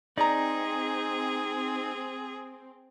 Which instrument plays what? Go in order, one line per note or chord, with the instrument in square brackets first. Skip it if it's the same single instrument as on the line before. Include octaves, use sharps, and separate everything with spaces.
[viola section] C4 [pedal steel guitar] D#4 [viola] G#4 [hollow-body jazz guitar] D5 A#5